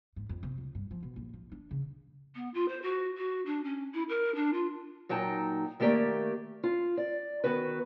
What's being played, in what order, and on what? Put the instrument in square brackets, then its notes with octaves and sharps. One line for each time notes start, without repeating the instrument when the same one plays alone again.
[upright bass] G#2
F2
C3
C#2
G2
F3
B2
A#1
F3
D4
C#3
[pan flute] B3
F4
C5
F#4
F#4
D4
C#4
E4
A#4
D4
F4
[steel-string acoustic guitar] A#2 F#3 D#4 G5 A5
D#3 A3 A#3 G4 D5
F4
D5
D#3 B3 F#4 B4